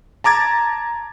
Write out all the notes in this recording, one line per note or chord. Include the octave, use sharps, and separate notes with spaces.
A5 A#5 D6 G#6 A6